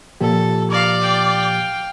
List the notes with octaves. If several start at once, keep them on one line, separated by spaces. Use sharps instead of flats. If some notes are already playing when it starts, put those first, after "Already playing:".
A#2 F3 G4 A4
A#4 D5 F5
F5 G5